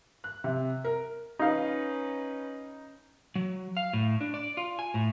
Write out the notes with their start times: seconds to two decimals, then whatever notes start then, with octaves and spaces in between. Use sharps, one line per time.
0.24 F#6
0.44 C3
0.84 A#4
1.39 C#4 D#4 B4 F5
3.36 F#3
3.77 F5
3.93 A2
4.21 D4
4.34 D5
4.57 F4
4.79 G#5
4.94 A2